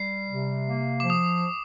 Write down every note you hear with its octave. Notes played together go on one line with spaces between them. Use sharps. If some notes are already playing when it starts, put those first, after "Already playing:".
Already playing: G3 C7
C3
A#3
F3 D6
D#6